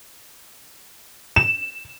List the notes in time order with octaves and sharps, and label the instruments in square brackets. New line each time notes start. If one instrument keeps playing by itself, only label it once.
[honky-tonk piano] E7